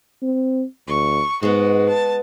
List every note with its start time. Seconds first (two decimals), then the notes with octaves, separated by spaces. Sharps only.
0.22 C4
0.88 D2 C#6
1.43 G#2 G#3 B3 F#4
1.90 A5